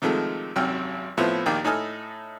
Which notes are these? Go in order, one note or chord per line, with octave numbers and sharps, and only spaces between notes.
C3 D#3 F3 G#3 A3
G#1 F#2 C3 G5 E6 F6
A2 F3 B3 C4 E4
A#1 D#2 D#3 A#3 G5
A2 D#4 A4 G#5 D#6 F6